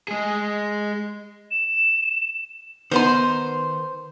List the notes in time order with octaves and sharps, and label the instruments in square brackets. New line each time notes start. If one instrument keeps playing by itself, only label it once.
[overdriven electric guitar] G#3 G#4
[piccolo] E7
[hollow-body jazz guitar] D#3 B3 D#4 [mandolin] C5 C6